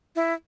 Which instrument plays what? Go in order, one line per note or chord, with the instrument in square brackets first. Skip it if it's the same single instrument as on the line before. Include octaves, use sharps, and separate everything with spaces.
[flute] E4